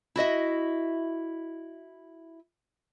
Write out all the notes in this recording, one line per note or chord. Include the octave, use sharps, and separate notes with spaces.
E4 F#4 D#5 E5